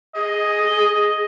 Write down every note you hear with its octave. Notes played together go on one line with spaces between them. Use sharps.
G#4 D#5